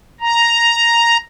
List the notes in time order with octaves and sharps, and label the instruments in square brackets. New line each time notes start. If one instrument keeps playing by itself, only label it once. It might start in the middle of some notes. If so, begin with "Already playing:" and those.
[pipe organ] A#5